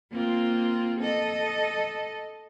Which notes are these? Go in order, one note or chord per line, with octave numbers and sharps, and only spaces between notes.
A#3 C4 F4
A4 D#5